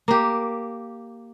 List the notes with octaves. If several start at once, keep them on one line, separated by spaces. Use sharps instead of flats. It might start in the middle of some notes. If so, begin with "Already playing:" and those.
A#3 G4